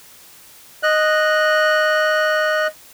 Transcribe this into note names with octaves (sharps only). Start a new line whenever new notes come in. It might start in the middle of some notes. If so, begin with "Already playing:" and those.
D#5 F#6